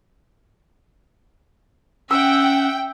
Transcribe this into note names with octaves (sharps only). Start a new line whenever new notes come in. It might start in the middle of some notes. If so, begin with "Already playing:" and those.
C#4 E5 F#5 G5 E6